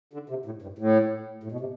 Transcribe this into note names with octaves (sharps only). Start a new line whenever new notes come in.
D3
C3
A2
G2
A2
A2
B2
C3